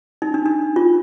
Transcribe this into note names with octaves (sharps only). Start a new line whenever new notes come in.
D#4
D4
D4
F4